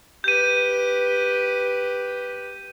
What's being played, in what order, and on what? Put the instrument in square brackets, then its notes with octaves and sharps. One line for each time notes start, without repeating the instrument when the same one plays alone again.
[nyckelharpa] G4 B4 [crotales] G6 D#7